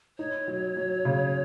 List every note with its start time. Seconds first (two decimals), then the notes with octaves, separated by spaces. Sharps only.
0.19 D#4 C#5
0.48 F#3
0.76 F#3
1.05 C#3